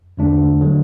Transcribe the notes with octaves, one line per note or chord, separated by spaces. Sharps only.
E2 D3 A3 D4
D3 F#3